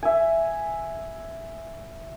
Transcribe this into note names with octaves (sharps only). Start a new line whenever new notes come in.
E5 G#5